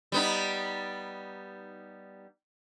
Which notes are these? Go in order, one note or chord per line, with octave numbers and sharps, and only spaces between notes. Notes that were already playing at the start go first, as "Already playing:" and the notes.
G3 B3 D#4